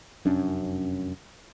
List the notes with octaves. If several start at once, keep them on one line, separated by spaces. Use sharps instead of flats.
F1 F#2 C#4 D4